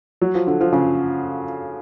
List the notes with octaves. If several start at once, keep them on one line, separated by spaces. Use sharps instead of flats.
F#3
F3
D3
F3
C#3